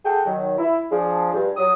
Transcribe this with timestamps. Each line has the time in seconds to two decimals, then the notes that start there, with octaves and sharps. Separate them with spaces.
0.05 F#4 G#4 A4 G5
0.26 D#3 F#3
0.58 E4
0.90 F3 D4 G#4
1.33 G2
1.57 F#3 D#6